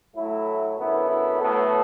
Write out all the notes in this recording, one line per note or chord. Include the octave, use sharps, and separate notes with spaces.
A2 F#3 A3 E4
F#2 D3 B3 E4
E4
A2 F#3 B3 A4